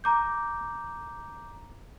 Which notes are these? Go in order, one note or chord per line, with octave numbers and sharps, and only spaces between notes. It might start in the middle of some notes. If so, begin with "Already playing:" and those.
A#5 D6 G6